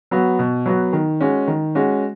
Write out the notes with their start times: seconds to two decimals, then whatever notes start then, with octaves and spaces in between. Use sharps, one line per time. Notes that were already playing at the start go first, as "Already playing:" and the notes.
0.11 F#3 B3 F#4
0.39 B2
0.66 F#3 B3 F#4
0.93 D#3
1.21 G#3 C#4 F#4
1.47 D#3
1.75 G#3 C#4 F#4